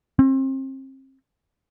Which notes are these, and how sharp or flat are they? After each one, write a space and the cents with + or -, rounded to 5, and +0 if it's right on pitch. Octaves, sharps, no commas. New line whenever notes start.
C4 +35